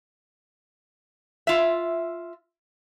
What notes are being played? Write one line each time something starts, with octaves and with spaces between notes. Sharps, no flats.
F4 E5